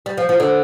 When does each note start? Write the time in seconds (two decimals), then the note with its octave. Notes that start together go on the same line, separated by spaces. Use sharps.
0.06 G3
0.18 F3
0.29 F3
0.40 D3